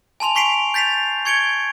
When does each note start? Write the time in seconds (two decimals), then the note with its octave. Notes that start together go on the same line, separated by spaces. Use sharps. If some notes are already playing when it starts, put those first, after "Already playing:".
0.20 G#5 A5 C6 F7
0.35 G#5 C#6 B6 C7 D7 F7
0.74 G6 A6 B6 C7 F7
1.25 C#6 G#6 C#7 D7 G7